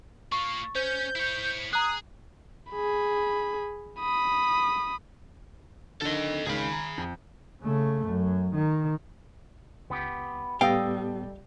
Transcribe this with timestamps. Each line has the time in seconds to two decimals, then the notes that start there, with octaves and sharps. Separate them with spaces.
0.32 A#3 F4 C#6
0.75 C#4 C5 G6
1.15 E4 C#5
1.73 G#4 A#5 D#6 F#6
2.71 G#4 B5
4.00 B5 D#6
6.02 D3 D#3 A4 D#5
6.46 C#2 D#3 G#3 G#4 B5
6.72 A#5
6.98 F2
7.62 C#3 A3
8.06 F#2
8.54 D#3
9.90 C#2 B3 G4
10.61 A2 G3 B3 G4 A4 D#5 F5 G5